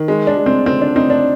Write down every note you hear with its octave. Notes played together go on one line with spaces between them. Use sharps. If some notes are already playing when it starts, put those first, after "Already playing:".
Already playing: D#3
G#3
D4
G#3
C4
D3 C4
D4
C4 D#4
D4